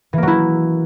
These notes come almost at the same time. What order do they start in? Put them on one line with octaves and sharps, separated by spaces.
E3 A#3 F#3 E4